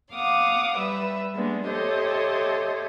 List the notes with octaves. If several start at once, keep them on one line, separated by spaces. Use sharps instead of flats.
F5 F#5 D6 D#6
G3 B4 E5
G3 G#3 A#3 B3 D4
G4 A4 C5 C#5 D#5 E5